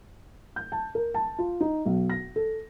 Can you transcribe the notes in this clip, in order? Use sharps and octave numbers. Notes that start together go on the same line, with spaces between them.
G6
A5
A#4
A5
F4
D#4
B1
A#6
A4